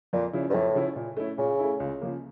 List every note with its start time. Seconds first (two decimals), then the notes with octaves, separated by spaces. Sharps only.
0.13 F2 A#2
0.33 C#3 F3 C#4 E4
0.50 G2
0.54 F2 A2
0.75 C#3 F3 C#4 E4
0.96 A#2
1.17 A3 C#4 E4
1.38 A#2 C#3
1.59 A3 C#4 E4
1.80 C#2
2.01 C#3 F3 A#3